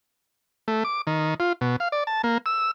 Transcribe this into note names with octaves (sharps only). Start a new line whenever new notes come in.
A3
D6
D#3
F4
B2
F5
D5
A5
A#3
E6